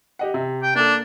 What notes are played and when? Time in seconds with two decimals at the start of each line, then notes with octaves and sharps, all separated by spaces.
0.19 G4 D#5 F#5
0.34 C3
0.63 G5
0.75 A#3 D4 A4